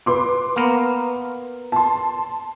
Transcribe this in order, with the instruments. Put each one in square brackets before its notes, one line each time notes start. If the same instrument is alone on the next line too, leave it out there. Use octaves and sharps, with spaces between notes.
[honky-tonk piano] B4 C6 D6
[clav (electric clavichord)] A#3 B3 A#4
[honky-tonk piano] A5 C6